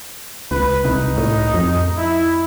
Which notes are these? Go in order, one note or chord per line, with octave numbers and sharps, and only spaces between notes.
C#2 B4
C2 D#4
A2
F2
E4